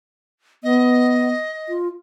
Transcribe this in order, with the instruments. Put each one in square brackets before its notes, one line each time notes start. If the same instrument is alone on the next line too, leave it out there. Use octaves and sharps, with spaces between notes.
[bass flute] B3 [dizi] D#5
[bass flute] F4